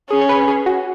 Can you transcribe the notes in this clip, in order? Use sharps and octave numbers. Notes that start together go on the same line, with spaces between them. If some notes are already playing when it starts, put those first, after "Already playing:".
C#4 G#4
C#5
B4
G#4
F#4